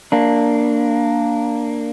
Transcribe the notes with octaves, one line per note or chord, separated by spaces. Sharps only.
A#3 D4